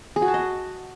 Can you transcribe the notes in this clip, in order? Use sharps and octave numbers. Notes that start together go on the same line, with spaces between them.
G#4
F#4
A5
D#5